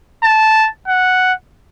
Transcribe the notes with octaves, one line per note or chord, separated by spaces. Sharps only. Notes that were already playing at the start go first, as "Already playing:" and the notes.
A5
F#5